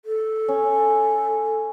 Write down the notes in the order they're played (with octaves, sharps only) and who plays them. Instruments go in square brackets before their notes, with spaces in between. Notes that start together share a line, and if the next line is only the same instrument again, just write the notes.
[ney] A4
[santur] C#4